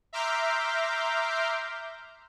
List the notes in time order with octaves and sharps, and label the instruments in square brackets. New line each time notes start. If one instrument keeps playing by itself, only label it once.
[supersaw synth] E5 A#5 C6 D6 F6 G6